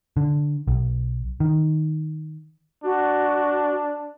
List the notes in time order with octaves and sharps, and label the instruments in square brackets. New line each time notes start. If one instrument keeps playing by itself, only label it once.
[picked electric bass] D3
B1
D#3
[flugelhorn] D4 [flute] F#4